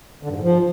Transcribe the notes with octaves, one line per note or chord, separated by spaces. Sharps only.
D3
G2
G#2
F3